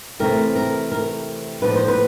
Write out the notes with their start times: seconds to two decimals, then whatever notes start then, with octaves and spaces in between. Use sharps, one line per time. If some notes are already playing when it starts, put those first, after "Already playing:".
0.20 C3 E3 A3 C4 A#4
0.55 A#4
0.92 A#4
1.62 A2 F3 A#3 D4 B4
1.76 C5
1.88 B4